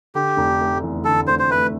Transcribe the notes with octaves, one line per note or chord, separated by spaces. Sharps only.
D3 G4
F1
A3
E2
D3 A4
F1 C5
C5
A3 B4